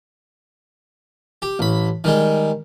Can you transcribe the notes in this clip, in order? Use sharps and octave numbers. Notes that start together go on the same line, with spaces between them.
G4
A1 B5
D#3 G3 G#3